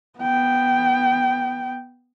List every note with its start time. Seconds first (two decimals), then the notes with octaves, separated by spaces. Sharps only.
0.19 B3 G5